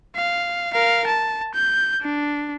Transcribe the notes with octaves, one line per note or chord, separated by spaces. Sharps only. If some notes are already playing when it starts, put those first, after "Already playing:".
F5
A#4 F5
A5
G6
D4